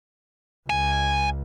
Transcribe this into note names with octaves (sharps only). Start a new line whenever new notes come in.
C#2 G#5